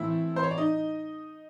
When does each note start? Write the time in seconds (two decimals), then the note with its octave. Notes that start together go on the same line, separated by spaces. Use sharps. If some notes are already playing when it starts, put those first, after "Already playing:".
Already playing: A2 E3 A3 C4 E4 E5
0.36 C5
0.43 C#5
0.51 D5
0.58 D#4 D#5